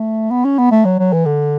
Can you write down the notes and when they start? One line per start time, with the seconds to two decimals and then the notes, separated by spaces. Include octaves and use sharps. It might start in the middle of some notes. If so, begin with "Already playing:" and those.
Already playing: A3
0.31 B3
0.45 C#4
0.59 B3
0.71 A3
0.85 F#3
0.99 F#3
1.13 E3
1.25 D3